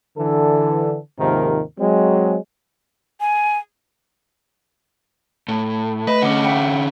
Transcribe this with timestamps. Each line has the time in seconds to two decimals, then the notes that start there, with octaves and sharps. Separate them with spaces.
0.18 D3 E3 A4
1.19 D#2 G#2 C3 D#3 F3 A#4
1.79 F#3 G#3 C4
3.20 G#5
5.48 A2
6.07 A3 B4 D#5
6.22 D3 C#4 F#5 D6
6.44 E5 F#5 G5